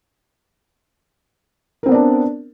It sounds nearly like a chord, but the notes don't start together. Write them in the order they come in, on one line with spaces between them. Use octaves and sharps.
A#4 C4 B3 D5 D4